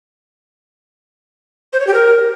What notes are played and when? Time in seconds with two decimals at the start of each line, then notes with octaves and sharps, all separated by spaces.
1.73 C5
1.80 C#5
1.87 G4
1.94 A#4